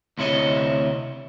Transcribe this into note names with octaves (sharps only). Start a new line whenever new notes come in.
D2 C3 E4 C#5 D#5